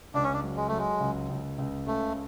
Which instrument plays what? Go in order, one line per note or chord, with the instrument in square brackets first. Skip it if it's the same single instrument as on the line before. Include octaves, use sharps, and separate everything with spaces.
[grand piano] C#2 [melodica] D4
[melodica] C#4
D4
[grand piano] F#3
[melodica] G#3
[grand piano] F#3 [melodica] A3
[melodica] G#3
[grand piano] C#2
C#2
C#2
[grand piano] C#3 [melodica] A3